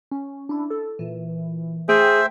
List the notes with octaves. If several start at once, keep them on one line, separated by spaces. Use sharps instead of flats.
C#4
D4 E4
A4
A#2 E3
A3 G#4 C5 E5 G5